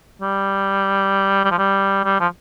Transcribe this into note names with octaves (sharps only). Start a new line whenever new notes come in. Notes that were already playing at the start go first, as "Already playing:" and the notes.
G3
G3
F3
G3
G3
F3